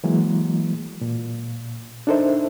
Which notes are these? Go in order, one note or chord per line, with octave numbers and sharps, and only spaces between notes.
E3 F#3 G#3 A#3
A#2
D4 D#4 A4 A#4 C5 E5